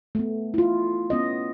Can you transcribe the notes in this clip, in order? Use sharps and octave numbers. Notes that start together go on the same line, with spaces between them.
A3 B3
E4 F4
B3 C#4 D#5